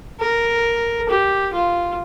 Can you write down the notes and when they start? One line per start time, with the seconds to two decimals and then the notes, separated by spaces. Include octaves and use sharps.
0.20 A#4
1.09 G4
1.53 F4